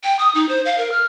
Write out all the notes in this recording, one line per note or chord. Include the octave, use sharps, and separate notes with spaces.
G5
D#6
D#4
C5
F5
A#4
F6